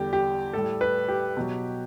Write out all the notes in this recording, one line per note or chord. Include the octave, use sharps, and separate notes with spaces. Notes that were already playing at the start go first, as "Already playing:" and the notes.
Already playing: E2 D3 G3 G4
G4
A2 G3 A4
B4
G4
B2 F#3